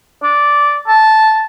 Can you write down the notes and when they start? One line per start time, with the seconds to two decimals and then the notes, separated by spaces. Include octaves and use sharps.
0.23 D5
0.88 A5